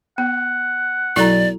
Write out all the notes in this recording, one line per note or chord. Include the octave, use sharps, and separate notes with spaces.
B3 F#5
B1 E4 A4 D5 A#5